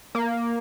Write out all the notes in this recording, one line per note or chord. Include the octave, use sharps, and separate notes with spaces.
A#3